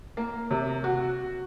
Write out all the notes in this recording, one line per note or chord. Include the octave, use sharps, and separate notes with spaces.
A#3
C3
F#4